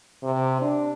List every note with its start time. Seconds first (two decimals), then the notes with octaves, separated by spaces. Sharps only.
0.23 C3
0.61 D4